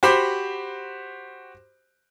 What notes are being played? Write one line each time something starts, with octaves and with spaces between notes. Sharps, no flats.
F#4 G4 C5 B5 D6